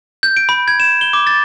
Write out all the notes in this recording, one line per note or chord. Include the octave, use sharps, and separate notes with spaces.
G6
D7
B5
G#6
E7
G7
D6
A6